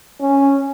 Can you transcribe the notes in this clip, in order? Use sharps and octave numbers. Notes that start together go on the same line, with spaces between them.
C#4